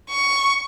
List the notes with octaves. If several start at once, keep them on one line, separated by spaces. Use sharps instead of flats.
C#6